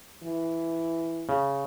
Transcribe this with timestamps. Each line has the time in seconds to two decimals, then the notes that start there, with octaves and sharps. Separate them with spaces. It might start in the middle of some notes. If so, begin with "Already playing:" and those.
0.23 E3
1.29 C#3